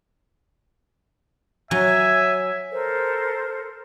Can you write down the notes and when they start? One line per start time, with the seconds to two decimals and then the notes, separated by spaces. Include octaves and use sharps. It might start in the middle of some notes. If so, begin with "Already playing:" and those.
1.71 F#3 E5 G#5
2.71 A4 A#4 C5